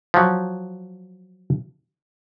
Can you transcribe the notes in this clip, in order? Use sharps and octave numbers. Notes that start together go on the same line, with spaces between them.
F3 F#3